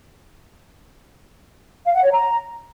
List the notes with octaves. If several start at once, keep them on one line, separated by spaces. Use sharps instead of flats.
F5
F#5
C#5
A#5